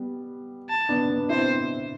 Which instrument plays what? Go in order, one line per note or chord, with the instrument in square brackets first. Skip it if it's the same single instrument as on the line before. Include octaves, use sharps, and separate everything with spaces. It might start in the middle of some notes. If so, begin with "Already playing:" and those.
Already playing: [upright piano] G3 B3
[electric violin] A5
[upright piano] B3 D4
B3 D4
[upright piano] C4 E4 [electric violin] C5